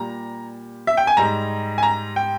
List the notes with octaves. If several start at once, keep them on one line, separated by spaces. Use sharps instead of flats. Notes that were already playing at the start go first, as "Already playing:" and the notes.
Already playing: A#2 G3 A#5
E5
G5
G#5
G#2 G3 A#5
G#5
A#5
G5